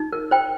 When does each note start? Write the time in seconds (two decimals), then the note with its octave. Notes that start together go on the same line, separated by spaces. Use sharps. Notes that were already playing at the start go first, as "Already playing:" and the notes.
Already playing: D#4
0.13 A#4
0.31 C5 G5